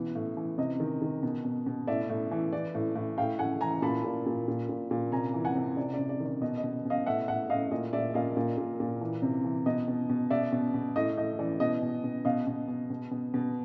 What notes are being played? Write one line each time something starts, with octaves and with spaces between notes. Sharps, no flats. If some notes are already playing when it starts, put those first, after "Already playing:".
Already playing: B2 E3
A2
E3
C3 D#5
D#3
D#3
B2
B2
B2
A2 D5 E5
A2
E3
E3 D5
A2
A2
A2 F5 G5
A2 F#5 G#5
E3 G#5 A#5
A#2 A5 B5
A#2
A#2
A#2
A#2
A#2
C3 G#5 A#5
E3
F#5 G#5
C3
C3 D5
D5
C3
D5
D#3
D5
B2 D#5
D#5
B2
B2 D#5 F5
A2 E5 F#5
A2 E5 F#5
A2 D#5 F5
A#2 D#5
A#2 D5 E5
A#2 D#5 F5
A#2
A#2
A#2
E3
C3
E3
B2 D#5
B2
B2
B2 D5 E5
B2
B2
A2 D#5
A2 D#5
E3 D5
B2 D#5
B2
B2
B2 D#5 F5
B2
B2
B2
B2
B2